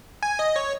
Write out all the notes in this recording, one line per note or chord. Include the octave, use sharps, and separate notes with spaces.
G#5
D#5
C#5